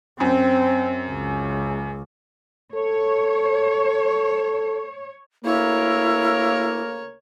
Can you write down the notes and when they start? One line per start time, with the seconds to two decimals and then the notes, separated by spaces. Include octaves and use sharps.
0.20 F#2 C4
1.10 C#2
2.75 A4 C#5
5.45 D2 C#3 A#3 E4 A#4 C#5